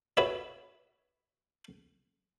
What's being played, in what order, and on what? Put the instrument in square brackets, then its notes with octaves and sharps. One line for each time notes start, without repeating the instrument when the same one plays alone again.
[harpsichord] F#4 B4 C#5 E5